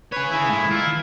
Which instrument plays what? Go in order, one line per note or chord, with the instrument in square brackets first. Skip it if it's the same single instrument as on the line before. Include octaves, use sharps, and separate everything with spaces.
[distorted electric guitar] G#4 C#5 [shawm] B4
[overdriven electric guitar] D#3 G#5 [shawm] E4
[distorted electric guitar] A2 G#3
[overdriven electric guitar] D#3 [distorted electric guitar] E4 [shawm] F4
[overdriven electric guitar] E3